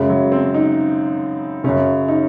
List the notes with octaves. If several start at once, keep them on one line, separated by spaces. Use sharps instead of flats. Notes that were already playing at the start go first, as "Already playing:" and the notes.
Already playing: F#2 C#3 G#3
F#3
C4
D#4
F#2 C#3 C#4
D#4